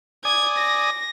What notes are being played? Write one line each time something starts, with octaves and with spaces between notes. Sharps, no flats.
D5 G#5 D#6 G#6
A#6